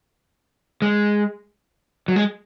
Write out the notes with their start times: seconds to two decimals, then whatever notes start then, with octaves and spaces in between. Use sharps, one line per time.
0.82 G#3
2.08 F#3
2.16 G#3